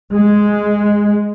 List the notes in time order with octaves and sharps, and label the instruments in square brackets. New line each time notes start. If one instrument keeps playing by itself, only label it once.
[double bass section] G#3